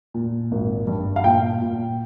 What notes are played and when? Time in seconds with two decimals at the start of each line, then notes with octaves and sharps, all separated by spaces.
0.14 A#2
0.51 G#1
0.87 G2
1.16 F5
1.24 A#2 G5
1.61 A#2